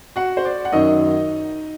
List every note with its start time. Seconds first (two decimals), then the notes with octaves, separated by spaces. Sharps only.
0.16 F#4 F#5
0.37 C5
0.45 D5
0.65 F#5
0.72 F#2 D#3 F#3 D#4 D#5